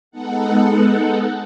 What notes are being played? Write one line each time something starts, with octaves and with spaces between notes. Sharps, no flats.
G#3 B3 D#4 A4 F#5